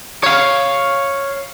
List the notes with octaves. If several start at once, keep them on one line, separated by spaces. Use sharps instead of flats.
C#5 F5